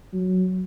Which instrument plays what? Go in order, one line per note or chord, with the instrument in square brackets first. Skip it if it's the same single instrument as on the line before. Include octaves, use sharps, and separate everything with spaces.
[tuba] F#3